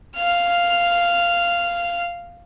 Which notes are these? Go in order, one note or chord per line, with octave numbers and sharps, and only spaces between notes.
F5 F6